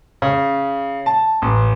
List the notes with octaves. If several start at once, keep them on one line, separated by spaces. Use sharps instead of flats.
C#3
A5
A1